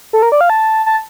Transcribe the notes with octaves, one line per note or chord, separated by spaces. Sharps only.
A4
A#4
D5
F5
A5
A5